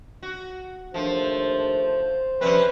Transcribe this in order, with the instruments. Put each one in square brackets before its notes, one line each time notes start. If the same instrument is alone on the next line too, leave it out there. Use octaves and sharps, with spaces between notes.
[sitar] F#4
[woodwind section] D#2 A3 D4 [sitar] F3 [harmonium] C5
[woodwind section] G2 C3 F3 [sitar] C4 C#4 [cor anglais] B4